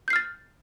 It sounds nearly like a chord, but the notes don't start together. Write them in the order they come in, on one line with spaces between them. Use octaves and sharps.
G6 C7 F6 A6